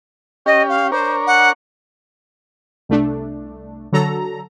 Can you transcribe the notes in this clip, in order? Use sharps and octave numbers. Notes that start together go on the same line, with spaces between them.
C#4 G4 D#5
F5
D4 A#4 C5 C#5
F#5
C2 A3 D4
D3 F#3 A4 A#5